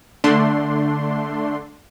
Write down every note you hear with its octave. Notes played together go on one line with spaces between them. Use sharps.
D3 A3 D4 C6